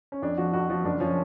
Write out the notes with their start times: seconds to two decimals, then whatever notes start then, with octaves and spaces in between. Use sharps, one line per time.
0.12 C#4
0.22 F2 D4
0.37 F3 F#4
0.53 F2 F#4
0.70 F3 F#4
0.84 F#1 D4
1.00 F3 C#4